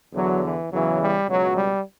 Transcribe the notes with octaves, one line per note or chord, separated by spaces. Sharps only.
E2 D3 F#3
E3
E2 C#3 E3 F#3
G3
C#2 B2 F#3
G3